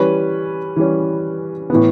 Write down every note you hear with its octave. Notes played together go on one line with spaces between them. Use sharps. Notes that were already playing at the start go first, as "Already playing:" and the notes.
Already playing: E3 G3 C#4 B4
E3 G3 C#4
A2 E3 B3